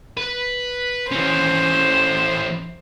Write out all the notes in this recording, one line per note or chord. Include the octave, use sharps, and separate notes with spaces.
B4
E3 C#4 C5